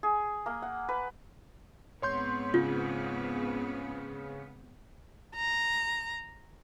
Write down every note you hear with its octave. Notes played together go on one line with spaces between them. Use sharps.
G#4
A#3
F#5
B4
G#2 B3 C4 C#5 C6 G6
C#3 F4
A#5